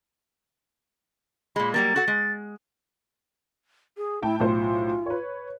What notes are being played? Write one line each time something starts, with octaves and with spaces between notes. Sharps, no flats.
A#2 G#3 B5
F#3 G3 A#3 A6
F#4 A4 F#5
G#3
G#4
A2 E4 G5 A5
B1 A2 F4 C5
B4 C#5